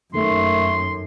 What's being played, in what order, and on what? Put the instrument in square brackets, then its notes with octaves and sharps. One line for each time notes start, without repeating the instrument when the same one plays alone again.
[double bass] F#2 [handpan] D#3 A#3 A4 [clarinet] A3 [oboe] C6